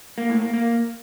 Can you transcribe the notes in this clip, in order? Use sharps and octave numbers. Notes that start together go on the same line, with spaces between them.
A#3
A2
A#3
A#3